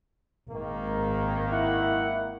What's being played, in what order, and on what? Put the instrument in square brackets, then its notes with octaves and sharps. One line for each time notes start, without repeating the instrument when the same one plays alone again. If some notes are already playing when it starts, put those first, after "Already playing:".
[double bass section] G#1 [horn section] D#3 A#3
[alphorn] E4 [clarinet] F#5